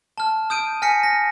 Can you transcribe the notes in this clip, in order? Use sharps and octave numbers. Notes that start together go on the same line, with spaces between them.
A5 F6
D#6 G6 D7 D#7
G#5 F6 A#6 B6 C#7
A#6